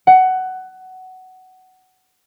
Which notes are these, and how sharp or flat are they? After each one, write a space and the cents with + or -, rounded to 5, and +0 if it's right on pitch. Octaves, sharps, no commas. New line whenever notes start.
F#5 +15